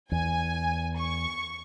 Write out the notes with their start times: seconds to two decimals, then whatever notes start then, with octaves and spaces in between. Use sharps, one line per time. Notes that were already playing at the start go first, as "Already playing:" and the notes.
0.12 E2 G#5
0.97 C#6